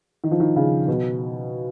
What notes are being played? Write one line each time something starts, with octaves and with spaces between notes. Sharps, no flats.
D#3
F3
D#3
C#3
B2